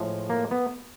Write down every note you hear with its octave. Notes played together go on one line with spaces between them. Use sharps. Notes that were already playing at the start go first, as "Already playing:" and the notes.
Already playing: A2 F3 G#3
A#3
B3